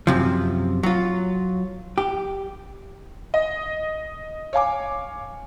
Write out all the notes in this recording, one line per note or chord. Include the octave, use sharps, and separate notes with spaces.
F#2 C3 F3
F#3 F4
G4
D#5
C#5 F5 G#5 D6